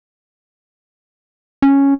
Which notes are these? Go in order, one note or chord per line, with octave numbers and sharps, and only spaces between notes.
C#4